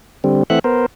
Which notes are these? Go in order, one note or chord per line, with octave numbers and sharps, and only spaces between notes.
D3 G3 C4
E3 A3 C4 E5 F#5 F#6
B3 A#4 C5